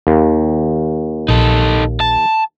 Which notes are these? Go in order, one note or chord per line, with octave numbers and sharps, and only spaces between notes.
D#2
A#1 D#4 A4
A5